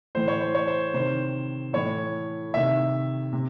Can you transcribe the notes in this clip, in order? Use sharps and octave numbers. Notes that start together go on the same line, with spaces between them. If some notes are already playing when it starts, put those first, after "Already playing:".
A2 E3 C5
C#5
C5
C#5
C5
C3 D#3 C5
A2 E3 C#5
C3 D#3 E5
C3